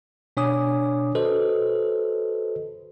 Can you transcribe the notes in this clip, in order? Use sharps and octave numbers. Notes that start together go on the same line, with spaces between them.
B2 D4 C#5 G#5 D6 D#6
F#4 A4 B4 C5 D#5